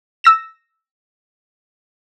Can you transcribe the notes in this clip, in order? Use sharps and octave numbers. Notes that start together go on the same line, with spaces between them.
E6 A#6 E7